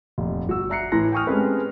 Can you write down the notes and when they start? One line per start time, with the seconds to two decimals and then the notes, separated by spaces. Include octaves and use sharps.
0.18 F1 A#2
0.47 G1 F#4 E6
0.70 D5 E5 A#5 F#6 C7 C#7
0.92 A2 E3 A#5 C6 F#6 A#6
1.12 G5 G#5 C#6 D#6 F6
1.27 G#3 A3 C4 C#4 G4 B4